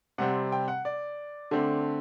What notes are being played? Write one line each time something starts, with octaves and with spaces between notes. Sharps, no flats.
C3 G3 C4 F#5
G5
F#5
D5
D3 A3 C4